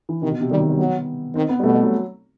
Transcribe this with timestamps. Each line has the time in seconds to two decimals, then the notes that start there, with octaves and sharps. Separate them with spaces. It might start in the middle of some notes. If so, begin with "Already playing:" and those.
0.09 E3
0.22 C3 D#3
0.31 B2
0.41 C3
0.50 D#3 G3
0.60 F#3
0.70 G3
0.78 F#3 B3
1.35 D#3 C4
1.49 B3
1.60 G3
1.63 B2 A3
1.73 G3
1.83 F#3